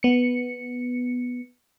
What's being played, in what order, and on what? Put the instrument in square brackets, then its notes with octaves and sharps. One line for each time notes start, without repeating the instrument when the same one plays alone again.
[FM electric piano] B3 C#7